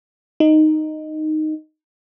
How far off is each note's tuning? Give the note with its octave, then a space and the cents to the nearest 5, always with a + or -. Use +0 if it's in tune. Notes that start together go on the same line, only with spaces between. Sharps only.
D#4 -5